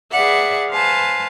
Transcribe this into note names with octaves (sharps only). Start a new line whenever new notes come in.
G#4 B4 D5 E5 F#5
B4 C5 F5 G#5 A5